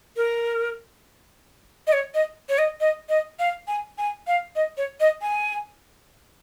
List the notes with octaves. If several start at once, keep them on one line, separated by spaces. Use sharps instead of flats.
A#4
D#5
C#5
D#5
C#5
D#5
D#5
D#5
F5
G#5
G#5
F5
D#5
C#5
D#5
G#5